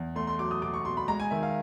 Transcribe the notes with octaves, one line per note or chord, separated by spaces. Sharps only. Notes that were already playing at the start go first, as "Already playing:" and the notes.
Already playing: E2
A3 C6
C6
F#3 D6
D#6
B2 D6
C#6
B2 C6
B5
G#3 A#5
G#5
D#3 E5
F5